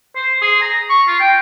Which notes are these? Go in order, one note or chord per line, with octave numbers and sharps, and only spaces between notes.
C5
G#4
A#5
C#6
F4
G5